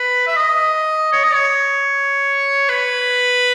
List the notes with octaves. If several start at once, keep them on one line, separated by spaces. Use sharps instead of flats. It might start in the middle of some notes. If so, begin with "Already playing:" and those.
Already playing: B4
E5
D#5
C#5
D#5
C#5
B4